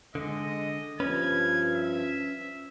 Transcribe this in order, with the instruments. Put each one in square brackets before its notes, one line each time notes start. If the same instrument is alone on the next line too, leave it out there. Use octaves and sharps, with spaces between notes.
[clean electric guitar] D3 [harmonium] G#3 [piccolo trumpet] D#5
[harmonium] G2 F3 [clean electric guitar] C#4 B4 [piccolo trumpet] G#6
[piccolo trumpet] E5